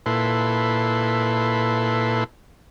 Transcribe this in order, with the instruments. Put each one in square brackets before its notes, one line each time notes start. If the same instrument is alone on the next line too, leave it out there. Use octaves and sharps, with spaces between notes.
[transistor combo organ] A#2 E4 A4 B4 C6